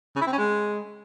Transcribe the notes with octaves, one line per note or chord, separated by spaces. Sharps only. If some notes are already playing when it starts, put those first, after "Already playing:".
C#3
E4
C4
C#4
G#3